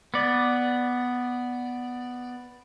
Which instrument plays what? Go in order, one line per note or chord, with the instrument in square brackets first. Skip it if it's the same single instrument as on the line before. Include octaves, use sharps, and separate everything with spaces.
[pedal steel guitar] B3 D5